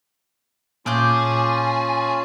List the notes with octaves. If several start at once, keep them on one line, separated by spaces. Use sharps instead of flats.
A#2 C#4 F4 G#4 A5 D6 G6